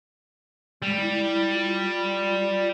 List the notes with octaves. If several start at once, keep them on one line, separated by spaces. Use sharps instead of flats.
G3 G#3
E4
F4